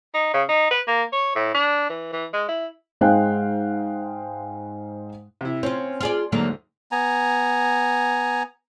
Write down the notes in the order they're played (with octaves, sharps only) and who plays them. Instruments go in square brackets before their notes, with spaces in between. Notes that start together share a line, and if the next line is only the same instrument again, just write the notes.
[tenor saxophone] D#4
C#3
D#4
B4
A#3
C#5
A2
D4
E3
E3
G#3
E4
[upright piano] G#2 G#3 C5 F5 G5 F#6
[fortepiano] C3 E4
[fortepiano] C4 [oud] C#4 F4
[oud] F4 G#4 D5
[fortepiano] D2 G#2 [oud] D3 F#3 A#3
[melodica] B3 G#5 A#5